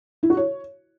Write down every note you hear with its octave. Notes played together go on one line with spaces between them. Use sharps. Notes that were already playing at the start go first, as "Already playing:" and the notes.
E4
F#4
C#5